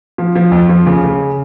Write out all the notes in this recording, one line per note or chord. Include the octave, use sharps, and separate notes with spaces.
F3
F3
F2
F3
C#3
C#3